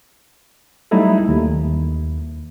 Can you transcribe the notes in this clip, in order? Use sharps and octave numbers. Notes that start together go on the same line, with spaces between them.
F#3 G3 A3 D#4 E4 A4
D#2